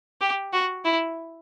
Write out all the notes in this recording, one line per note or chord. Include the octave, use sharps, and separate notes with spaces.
G4
F#4
E4